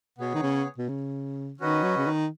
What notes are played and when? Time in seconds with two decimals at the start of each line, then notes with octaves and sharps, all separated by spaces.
0.18 B2 B3 G#4 C#5
0.34 D#3
0.42 C#3
0.78 B2
0.88 C#3
1.59 D#3 C#4 F#4 B4 D#5
1.83 F#3
1.97 C#3
2.06 D#3